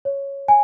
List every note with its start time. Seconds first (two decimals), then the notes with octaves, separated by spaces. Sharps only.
0.05 C#5
0.48 G#5